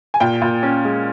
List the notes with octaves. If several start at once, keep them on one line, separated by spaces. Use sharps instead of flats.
G#5
A#2 G5
A#2
C#4
G#3